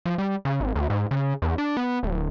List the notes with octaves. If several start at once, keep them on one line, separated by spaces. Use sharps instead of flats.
F3
G3
C#3
G#1
D2
G#2
C#3
E2
D4
B3
D1